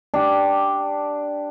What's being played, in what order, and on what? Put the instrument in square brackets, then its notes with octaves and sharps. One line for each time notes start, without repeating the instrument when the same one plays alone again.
[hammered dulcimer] D4 G4